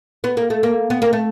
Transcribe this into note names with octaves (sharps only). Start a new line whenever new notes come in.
B3
A#3
A3
A#3
B3
A#3
A3